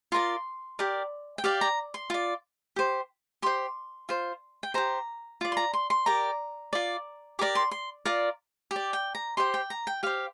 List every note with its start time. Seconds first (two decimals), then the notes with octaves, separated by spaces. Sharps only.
0.12 F4 A#4 D5 C6
0.79 G4 A#4 D5
1.38 G5
1.44 G4 D5 F5
1.61 A#5
1.94 C6
2.10 F4 D5
2.76 G4 C5
3.42 G4 C5 C6
4.09 F4 C5
4.63 G5
4.74 G4 C5 A#5
5.41 F4 D5
5.52 C6
5.57 A#5
5.73 C6
5.90 C6
6.06 G4 A#4 D5 A#5
6.73 F4 D5
7.39 G4 A#4 D5 D6
7.55 C6
7.71 C6
8.05 F4 A#4 D5
8.71 G4
8.76 D5
8.93 G5
9.15 A#5
9.37 G4 C5 C6
9.54 G5
9.70 A#5
9.87 G5
10.03 G4 C5 F5